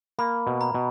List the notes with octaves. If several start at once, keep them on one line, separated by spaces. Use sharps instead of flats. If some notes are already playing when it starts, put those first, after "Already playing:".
A#3 B5
B2
A#5
B2